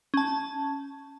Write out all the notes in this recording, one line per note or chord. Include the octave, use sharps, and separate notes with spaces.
C#4 A5